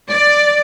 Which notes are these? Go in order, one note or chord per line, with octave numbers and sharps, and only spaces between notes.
D5